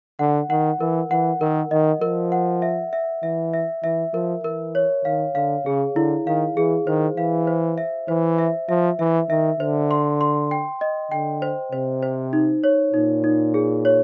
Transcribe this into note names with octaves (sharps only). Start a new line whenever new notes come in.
D3 F#5
D#3 F#5
E3 A#4
E3 F#5
D#3 A#4
D#3 D#5
F3 A#4
F#5
E5
E5
E3 E5
E5
E3 E5
F3 A#4
E3 A#4
C#5
D#3 F5
D3 F5
C#3 G#4
D3 E4
D#3 F5
E3 G#4
D#3 C5
E3 F5
C5
E5
E3 C5
E5
F3 E5
E3 E5
D#3 E5
D3 C5
C6
C6
G5
D#5
D3 G5
C5
C3 C5
C5
D#4
C#5
A#2 D#4
D#4
G#4
C#5